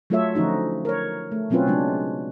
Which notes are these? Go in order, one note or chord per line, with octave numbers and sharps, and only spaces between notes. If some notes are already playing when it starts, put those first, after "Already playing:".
F#3 A3 F4 A4 C#5 E5
D3 F3 C#4 D#4 F#4
A#4 C#5
A3
B2 F#3 C4 C#4 F4 B4
C#3 F#3 G#3 D4